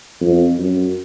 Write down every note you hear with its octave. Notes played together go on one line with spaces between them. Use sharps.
F2
F#2